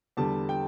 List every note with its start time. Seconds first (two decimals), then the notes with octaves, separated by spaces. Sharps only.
0.17 E2 D3 G3 A5
0.49 G5